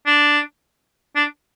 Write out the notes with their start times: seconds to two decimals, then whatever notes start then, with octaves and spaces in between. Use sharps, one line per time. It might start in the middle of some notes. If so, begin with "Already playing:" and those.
0.07 D4
1.16 D4